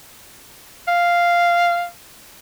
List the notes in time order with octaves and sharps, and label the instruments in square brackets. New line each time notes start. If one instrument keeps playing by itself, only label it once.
[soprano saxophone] F5